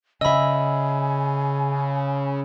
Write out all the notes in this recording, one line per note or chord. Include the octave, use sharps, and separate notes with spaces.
C#3 D#5 E5 G#5 B5 E6